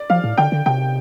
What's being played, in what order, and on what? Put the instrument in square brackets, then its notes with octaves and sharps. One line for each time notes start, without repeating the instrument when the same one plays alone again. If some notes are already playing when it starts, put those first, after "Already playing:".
Already playing: [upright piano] D5
[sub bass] F3 [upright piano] F5
[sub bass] A2
[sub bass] D3 [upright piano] G5
[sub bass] D3
[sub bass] C3 [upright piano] G5